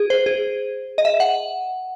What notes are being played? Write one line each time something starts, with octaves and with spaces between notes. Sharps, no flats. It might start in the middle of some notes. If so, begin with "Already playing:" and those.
Already playing: G#4
C5
G#4
D#5
E5
F#5